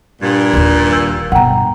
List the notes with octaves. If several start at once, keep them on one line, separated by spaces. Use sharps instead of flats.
G2 A#2
D#1 D#2
E6 G6
G2 B2 F#5 G5 A#5